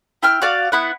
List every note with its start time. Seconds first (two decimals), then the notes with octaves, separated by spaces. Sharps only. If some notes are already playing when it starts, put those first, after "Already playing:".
0.23 E4 G5 F6
0.42 F#4 D5 F5
0.72 B3 E4 F#5